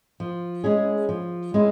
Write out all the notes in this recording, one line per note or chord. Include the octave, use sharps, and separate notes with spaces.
F3
G#3 C#4 E4 G#4
F3
G#3 C#4 E4